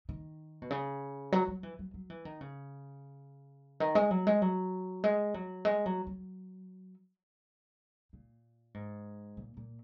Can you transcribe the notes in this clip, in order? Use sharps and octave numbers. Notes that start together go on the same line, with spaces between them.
D#3
B2
C#3
F#3
F#3
E3
F#3
F#3
E3
D#3
C#3
D#3
G#3
F#3
G#3
F#3
G#3
F#3
G#3
F#3
F#3
A#2
G#2
A#2
A#2